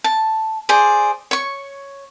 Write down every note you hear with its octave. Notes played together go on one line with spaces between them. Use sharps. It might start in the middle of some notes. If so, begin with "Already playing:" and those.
A5
G#4 C5 D5
C#5 C#6